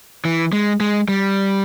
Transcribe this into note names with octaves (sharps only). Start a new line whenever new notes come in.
E3
G#3
G#3
G3